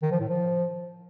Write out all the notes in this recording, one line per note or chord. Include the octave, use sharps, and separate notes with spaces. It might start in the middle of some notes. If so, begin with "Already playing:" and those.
D#3
F3
A2
F3